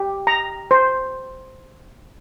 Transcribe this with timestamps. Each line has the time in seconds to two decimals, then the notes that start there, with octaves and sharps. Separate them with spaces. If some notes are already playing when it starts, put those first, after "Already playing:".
Already playing: G4
0.27 A#5
0.71 C5